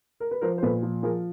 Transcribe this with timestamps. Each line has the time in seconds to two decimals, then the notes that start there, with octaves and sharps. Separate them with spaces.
0.20 A#4
0.31 B4
0.41 F3 A#4 C5
0.58 C5
0.62 A#2 A4 B4
0.83 F3
1.03 F3 G#4 A#4